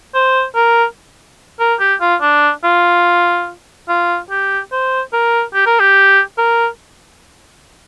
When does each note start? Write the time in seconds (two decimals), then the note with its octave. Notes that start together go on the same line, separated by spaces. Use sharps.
0.15 C5
0.55 A#4
1.60 A#4
1.80 G4
2.01 F4
2.21 D4
2.64 F4
3.89 F4
4.30 G4
4.72 C5
5.13 A#4
5.54 G4
5.66 A#4
5.79 G4
6.38 A#4